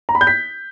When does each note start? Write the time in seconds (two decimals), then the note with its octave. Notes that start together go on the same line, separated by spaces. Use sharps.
0.09 A#5
0.15 B5
0.21 G6
0.27 B6